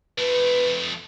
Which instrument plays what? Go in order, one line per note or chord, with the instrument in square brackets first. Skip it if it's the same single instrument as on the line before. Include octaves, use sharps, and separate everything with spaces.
[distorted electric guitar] F2 A3 [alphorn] B4